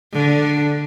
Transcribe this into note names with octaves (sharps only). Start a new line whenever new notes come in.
D3